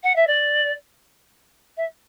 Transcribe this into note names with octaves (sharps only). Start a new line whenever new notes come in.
F#5
E5
D5
E5